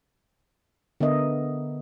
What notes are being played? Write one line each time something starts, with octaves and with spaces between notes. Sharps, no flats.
D3 B3 A#4 D#5 E5